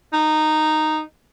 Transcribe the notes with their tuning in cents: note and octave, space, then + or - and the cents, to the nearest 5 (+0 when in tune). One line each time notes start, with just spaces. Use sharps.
D#4 -10